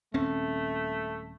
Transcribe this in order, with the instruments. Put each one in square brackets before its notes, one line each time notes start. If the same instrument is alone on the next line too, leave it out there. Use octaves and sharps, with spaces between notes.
[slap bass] D#1 C4 C#4 [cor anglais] A3